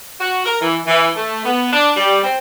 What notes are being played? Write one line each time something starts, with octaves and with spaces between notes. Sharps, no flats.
F#4
A#4
E3
E3
A3
B3
D4
G3
C4